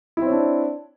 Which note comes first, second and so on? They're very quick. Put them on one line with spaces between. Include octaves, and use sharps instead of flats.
E4 C4 C#5 D4